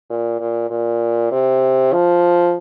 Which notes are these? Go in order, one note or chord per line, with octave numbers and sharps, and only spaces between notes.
A#2
A#2
A#2
C3
F3